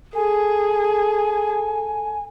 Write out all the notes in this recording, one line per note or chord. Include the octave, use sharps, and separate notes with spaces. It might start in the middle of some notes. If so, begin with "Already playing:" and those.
G#4 A4 G#5